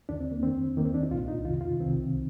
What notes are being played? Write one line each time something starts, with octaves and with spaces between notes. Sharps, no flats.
D#2 D3 D4
C4
A#3
F2 D#3 C4
D#2 D#3 A#3 C4
D4
D#4
C2 A#2 F4
D#4
F2 C3 D#3 F4
F4
C2 C3 D#3 C4